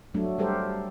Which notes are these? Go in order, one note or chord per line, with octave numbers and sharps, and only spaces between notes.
F#3 A3 D4
G3 G4 A4 A#4 C5